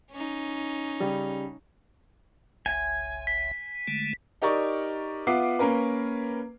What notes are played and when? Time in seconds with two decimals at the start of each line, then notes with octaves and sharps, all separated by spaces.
0.12 C#4 D#4
1.00 C#3 G3
2.66 F#1 C2 E5 G#5
3.27 B6
3.87 D3 G#3 A3
4.42 D#4 G4 A#4 D5 C#6
5.27 B3 F4 E5 F#5 D6 C7
5.59 A#3 C#4 A#4 B4